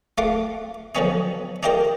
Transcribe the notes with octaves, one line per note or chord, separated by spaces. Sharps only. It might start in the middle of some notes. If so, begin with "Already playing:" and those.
A3 F4 F5 F#5 D6
D3 F3 F#3 B3 C#4 D#4
D4 D#4 F4 G4 A#4 C5